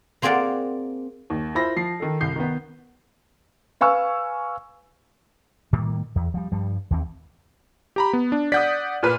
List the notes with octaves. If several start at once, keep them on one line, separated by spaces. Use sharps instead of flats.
A#3 C4 G#4 A#4 D5 F#5
D#2
E4 F4 C5 B5 A#6
F3 C7
D#3 A4
C2 G6 C7
D#3 B3
B4 F5 G#5 C#6 E6
A2 D#3 G3 A#3
E2
F3 G3
G2 F3 G3
D#2 E3 C4
G4 A#5 B5
B3
D4
D5 F#5 D#6 G6 B6
A#2 B4 F6